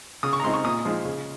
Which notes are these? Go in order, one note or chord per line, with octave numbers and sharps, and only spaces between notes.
C#3 D#6
C#6
A#5
G#3 C4 D#4 C6
C#6
A#2 D#6
F3 G#3 D#4
C#3